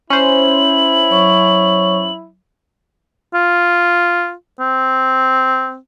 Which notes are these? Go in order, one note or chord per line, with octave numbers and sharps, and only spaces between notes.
C#4 E4 C5 F#7
F#3 C#5 C#6
F4
C4